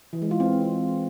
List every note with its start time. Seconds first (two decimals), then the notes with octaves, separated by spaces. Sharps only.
0.13 E3
0.22 G#3
0.31 F4
0.40 C4